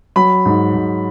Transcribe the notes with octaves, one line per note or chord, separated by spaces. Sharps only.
F#3 B5
G#2
G#2